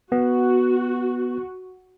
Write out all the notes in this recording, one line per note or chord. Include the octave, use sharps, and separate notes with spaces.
B3 F#4